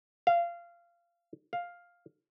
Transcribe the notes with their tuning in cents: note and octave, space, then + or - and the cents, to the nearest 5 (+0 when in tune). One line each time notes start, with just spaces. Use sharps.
F5 -20
F5 +5